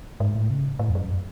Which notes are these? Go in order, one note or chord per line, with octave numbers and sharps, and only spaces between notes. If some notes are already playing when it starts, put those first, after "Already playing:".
G#2
A2
C#3
A2
E2
F#2